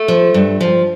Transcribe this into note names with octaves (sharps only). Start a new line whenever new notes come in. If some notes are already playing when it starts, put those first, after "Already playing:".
Already playing: A3
F3
G2
F3